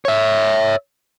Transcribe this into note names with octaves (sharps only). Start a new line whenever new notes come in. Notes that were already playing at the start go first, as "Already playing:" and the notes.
C#5 E5